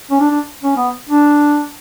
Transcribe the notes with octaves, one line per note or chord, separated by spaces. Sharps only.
C#4
D4
D4
C#4
B3
D4